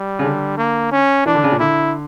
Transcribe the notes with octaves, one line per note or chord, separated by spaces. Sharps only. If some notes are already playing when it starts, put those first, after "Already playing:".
Already playing: G3
C#3
D3
A#3
C#4
E3 D4
D3
C#3
A#2
D3 E4